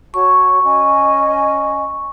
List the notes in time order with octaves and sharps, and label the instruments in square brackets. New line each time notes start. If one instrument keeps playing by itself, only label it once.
[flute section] F#4 C#5 A5 [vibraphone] C#6
[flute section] C#4 D#5